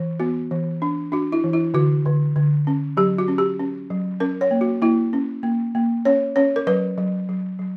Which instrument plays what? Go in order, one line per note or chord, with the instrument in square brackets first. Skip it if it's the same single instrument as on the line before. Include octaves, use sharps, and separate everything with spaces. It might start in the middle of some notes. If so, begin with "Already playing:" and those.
Already playing: [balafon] E3
B3 F#4
E3
D4
D4 F#4
E4
E3
E4
D3 F#4
D3
D3
C#4
F#3 G4
F#4
C#4
G4
C#4
F#3
C#4 A#4
C#5
A#3
F#4
A#3 E4
C#4
A#3
A#3
C#4 C#5
C#4 C#5
A#4
F#3 B4
F#3
F#3
F#3